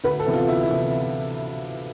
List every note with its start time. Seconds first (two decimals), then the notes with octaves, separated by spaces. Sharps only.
0.04 D2 B4
0.20 A4
0.26 C3 E3 B3
0.34 F4
0.48 D2 E4
0.63 E4
0.70 C3 E3 B3